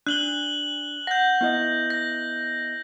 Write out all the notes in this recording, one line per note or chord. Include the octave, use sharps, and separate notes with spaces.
D4 F#6 F#7 G7
F#5 G6 A#6
B3 E4 D#5
A#6